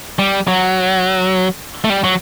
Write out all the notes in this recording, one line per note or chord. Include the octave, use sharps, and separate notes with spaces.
G3
F#3
A3
G3
F#3